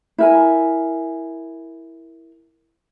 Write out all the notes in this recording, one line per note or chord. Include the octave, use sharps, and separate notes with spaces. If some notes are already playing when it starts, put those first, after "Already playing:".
E4 A#4 G#5